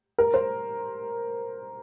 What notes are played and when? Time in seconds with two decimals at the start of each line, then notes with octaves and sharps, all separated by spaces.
0.18 A#4
0.34 C5